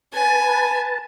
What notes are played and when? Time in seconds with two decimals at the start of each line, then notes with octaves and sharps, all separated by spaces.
0.13 B4 G#5 A5